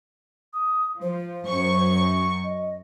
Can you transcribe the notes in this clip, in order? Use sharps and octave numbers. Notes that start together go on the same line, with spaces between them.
D#6
F3 C5
F#2 C#6
D#5